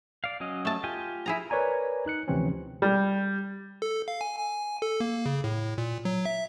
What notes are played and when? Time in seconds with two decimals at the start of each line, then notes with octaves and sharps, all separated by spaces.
0.24 D5 F5
0.40 F#3 C#4 D#5
0.65 A3 A5
0.84 F4 G4 G#5
1.26 E4 G#4 A#5
1.50 A#4 B4 C#5 D5 G#5 A#5
2.06 D#4 F#6 C#7
2.28 D2 C3 E3 F3 C4 C#4
2.82 G3
3.82 A4
4.08 F5
4.21 G#5
4.39 G#5
4.82 A4
5.00 A#3
5.26 C#3
5.44 A2
5.78 A#2
6.05 F#3
6.25 E5